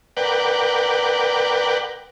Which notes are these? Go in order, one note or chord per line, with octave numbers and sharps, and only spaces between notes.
A#4 B4 D5 F#5 G5